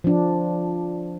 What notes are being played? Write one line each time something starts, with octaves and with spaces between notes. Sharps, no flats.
F3 D4